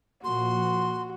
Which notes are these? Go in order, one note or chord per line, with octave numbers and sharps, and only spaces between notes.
A#2 F3 A#3 F#4 C6